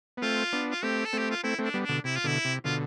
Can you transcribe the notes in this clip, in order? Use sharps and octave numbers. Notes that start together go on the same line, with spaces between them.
B3
A3 C4 F4
B3 D4
F4
A3 C4 G4
A4
A3 C4 G4
F4
A3 C4 E4
A3 C4 D4
G3 B3
D4
B2 D3
C3 E4
F4
B2 D3 E4
C3
B2 D3 F4